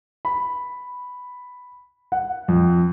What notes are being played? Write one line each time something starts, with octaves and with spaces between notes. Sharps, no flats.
B5
F#5
F2